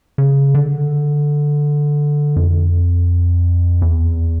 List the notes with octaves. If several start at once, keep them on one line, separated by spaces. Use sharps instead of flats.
C#3
D3
F2
E2